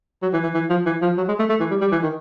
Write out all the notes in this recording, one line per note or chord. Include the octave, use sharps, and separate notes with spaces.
F#3
E3
E3
E3
F3
E3
F3
F#3
G#3
A3
A3
E3
G3
G3
E3
D#3